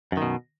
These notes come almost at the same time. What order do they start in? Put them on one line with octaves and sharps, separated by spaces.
F#2 D#3 B2